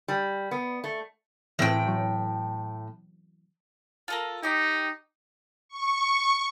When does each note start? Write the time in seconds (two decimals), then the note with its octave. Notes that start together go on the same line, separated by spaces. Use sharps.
0.08 G3
0.51 B3
0.84 A3
1.59 A2 E3 A3 C4 G5
1.87 F#3
4.08 F4 A4 A#4
4.43 D#4 G4 D6
5.69 C#6